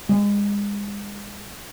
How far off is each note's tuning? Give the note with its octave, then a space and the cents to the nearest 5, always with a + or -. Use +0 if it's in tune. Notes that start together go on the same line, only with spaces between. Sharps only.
G#3 -35